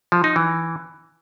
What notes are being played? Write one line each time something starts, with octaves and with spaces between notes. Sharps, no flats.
F3
D#4
E3